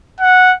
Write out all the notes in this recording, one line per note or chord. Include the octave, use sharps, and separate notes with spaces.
F#5